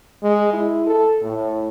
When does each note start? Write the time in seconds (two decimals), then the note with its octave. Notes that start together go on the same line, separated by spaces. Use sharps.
0.23 G#3
0.53 E4
0.87 A4
1.22 A2